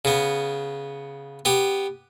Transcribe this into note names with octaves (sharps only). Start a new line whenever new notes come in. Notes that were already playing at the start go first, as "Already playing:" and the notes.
C#3 B3
B3 G4